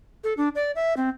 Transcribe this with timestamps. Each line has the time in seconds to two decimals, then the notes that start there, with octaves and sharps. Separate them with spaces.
0.24 A4
0.37 D4
0.55 D5
0.75 E5
0.97 C4